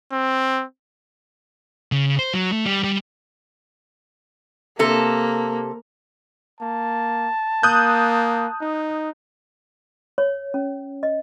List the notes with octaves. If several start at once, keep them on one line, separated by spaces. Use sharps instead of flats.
C4
C#3
C5
F#3
A3
G3
G3
C3 A#3 A4
A#3 A5
A#3 D#6 F#6 G6
D#4
C#5
C#4
D#5